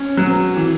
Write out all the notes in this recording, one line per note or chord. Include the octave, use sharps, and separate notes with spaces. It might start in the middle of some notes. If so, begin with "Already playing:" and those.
Already playing: C#4
F#3
E3